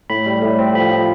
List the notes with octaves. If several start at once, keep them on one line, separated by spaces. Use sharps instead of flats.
A2 B5
G3
A2
C4
F3 B5
F3